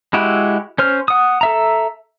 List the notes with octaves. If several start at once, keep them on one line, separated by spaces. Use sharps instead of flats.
G#3 E4 F#4 G4
C#4 C5 F6
F#5 D#6
A4 E5 A#5